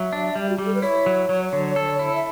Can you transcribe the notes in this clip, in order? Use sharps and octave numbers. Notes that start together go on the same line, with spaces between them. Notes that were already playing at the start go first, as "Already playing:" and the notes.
Already playing: F#3 E5
D4
G3
F#4
G3 G4
A4
B4
E4 C#5
F#3
F#3
D3
A4
E4
E5